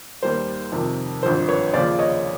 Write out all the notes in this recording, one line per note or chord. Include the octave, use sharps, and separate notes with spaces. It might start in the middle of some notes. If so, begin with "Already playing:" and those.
D#2 D#3 G3 C5
F2 C3 D#3
G#1 G2 D3 F3 C5
B4 C#5
D#2 C#3 F3 C5 D5
C#5 D#5